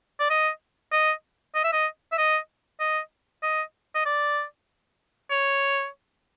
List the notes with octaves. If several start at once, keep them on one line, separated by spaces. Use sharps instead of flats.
D5
D#5
D#5
D#5
E5
D#5
E5
D#5
D#5
D#5
D#5
D5
C#5